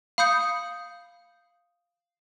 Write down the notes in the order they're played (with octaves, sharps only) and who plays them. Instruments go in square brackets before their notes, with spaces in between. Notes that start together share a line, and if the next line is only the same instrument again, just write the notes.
[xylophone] F5 B5 D#6 G6 C#7